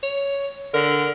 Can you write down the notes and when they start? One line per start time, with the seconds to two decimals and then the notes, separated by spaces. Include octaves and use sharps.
0.03 C#5
0.74 D3 A#4